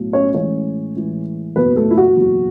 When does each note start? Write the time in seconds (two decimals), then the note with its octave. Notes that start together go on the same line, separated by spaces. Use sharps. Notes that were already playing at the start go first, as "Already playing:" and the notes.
Already playing: B1 A2 F#3
0.13 C#4 C#5
0.33 A1 A2 E3 G#3 C#4 C#5
0.95 A1 A2 E3 G#3
1.56 F#1 E2 B2 F#3 B3 B4
1.76 A3 A4
1.91 E4
1.98 F#4
2.17 F#1 E2 B2 F#3